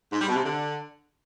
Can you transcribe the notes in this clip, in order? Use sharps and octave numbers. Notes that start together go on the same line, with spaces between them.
G#2
G3
B2
C3
D3